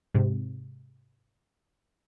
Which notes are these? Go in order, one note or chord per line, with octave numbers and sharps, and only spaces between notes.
G#2 C3